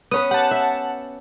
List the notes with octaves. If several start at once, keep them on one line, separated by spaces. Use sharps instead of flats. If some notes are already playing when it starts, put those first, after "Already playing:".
B3 C#4 B4 D#6
G4 F#5 A5
E5